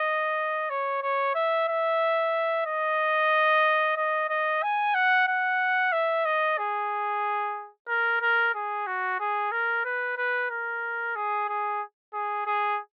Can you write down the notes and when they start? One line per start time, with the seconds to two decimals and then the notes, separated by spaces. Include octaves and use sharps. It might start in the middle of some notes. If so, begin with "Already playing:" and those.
Already playing: D#5
0.70 C#5
1.02 C#5
1.35 E5
1.68 E5
2.66 D#5
3.96 D#5
4.29 D#5
4.62 G#5
4.95 F#5
5.28 F#5
5.92 E5
6.25 D#5
6.58 G#4
7.88 A#4
8.21 A#4
8.54 G#4
8.87 F#4
9.20 G#4
9.52 A#4
9.85 B4
10.17 B4
10.50 A#4
11.16 G#4
11.48 G#4
12.13 G#4
12.46 G#4